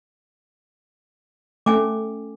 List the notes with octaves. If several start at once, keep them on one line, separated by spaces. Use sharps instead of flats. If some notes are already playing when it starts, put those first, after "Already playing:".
A3 C#4 G#5 D6